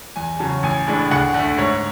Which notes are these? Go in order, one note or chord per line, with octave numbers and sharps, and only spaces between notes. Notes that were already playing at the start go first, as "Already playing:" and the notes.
E2 G#5
C#3 F#3 C#4 A5
A1 G#5
A2 G#3 D4
D2 F#5
D3 A3
G#2 C#5